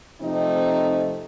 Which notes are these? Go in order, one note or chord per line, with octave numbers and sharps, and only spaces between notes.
C3 F3 A3 C4 D#4